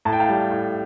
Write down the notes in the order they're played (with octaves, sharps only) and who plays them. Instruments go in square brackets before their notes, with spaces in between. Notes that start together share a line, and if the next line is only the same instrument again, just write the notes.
[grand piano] A2 A5
G5
F5 A5
G3
A2